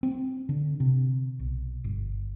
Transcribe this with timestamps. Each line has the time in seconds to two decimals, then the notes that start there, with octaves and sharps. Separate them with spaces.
0.03 C4
0.49 D3
0.80 C3
1.40 B1
1.84 G1